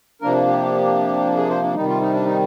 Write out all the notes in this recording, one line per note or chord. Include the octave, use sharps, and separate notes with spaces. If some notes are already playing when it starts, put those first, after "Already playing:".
C3 F3 A#3 D4 A#4
G4
G#4
C5
D4
C3 D#3 G3 D#4
F4
D#4
D4
D#4